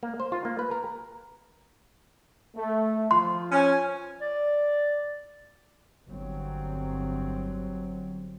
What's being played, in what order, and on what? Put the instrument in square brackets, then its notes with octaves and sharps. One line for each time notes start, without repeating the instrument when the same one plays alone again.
[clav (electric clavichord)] A#3
C5
F4
A#3
B4
A#4
[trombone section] A3
[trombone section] F3 F4 [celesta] C6
[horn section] C#4 G#5
[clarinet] D5
[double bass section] G1 F#3 C4